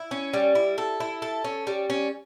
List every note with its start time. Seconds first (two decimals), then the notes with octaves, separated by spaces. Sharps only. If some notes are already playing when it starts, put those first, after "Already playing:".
Already playing: E4
0.11 C#4
0.34 G3
0.55 E4
0.78 A4
1.00 E4
1.22 A4
1.44 C#4
1.67 G3
1.90 C#4